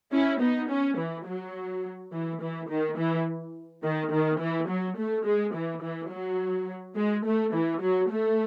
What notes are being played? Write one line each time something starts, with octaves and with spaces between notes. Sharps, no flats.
C#4 E4
B3 D#4
C#4
E3
F#3
E3
E3
D#3
E3
D#3
D#3
E3
F#3
A3
G#3
E3
E3
F#3
G#3
A3
E3
F#3
A3